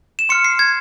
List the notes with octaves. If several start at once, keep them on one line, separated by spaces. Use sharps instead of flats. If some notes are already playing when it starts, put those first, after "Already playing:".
E7
C6 F6 C#7
C7
G#6